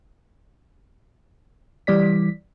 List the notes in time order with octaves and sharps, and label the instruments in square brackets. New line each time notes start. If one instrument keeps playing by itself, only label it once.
[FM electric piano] E3 G3 D5 B6